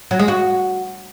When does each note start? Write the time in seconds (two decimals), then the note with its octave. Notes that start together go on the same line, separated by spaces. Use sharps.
0.11 F#3
0.19 G#3
0.28 F#4